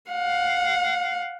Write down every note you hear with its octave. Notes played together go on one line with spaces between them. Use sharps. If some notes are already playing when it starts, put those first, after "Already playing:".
F5 F#5